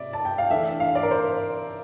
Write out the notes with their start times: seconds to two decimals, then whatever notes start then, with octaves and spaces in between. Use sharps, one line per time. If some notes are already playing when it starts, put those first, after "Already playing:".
Already playing: C3 C4 D5 E5
0.13 A5
0.25 G5
0.38 F5
0.50 E3 A3 D4 E5
0.80 F5
0.95 D5
1.03 A#4
1.11 C5